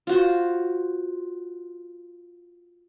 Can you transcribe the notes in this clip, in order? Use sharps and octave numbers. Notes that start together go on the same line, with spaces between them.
F4 F#4 C5